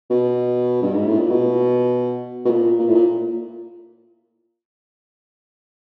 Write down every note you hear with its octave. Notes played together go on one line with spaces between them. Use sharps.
B2
G2
G#2
A2
A#2
B2
B2
A#2
A#2
A2
A#2